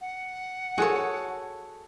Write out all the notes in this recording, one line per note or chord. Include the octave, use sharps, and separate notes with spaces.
F#5
F#4 G#4 A4 C#5